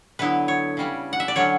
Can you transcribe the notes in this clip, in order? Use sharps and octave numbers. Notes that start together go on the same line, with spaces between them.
D3 F#3 B3 E4 B4
C#5
C#3 G3 C#4
F#5
E5
D5
D3 F#3 C#4 C#5